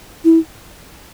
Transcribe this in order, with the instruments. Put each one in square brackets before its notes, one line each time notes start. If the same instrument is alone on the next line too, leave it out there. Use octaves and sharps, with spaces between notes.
[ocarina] E4